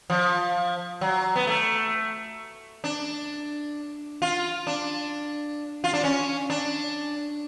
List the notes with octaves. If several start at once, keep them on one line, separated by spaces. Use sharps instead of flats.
F3
F#3
B3
A3
D4
F4
D4
F4
D4
C#4
D4